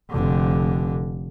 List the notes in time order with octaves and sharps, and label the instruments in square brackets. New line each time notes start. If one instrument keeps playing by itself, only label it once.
[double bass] F1 D3